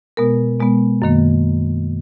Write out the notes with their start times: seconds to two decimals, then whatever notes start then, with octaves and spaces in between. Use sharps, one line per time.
0.17 B2 G#3 B3 A#4
0.60 B2 G#3 B3
1.02 F#2 D#3 A#3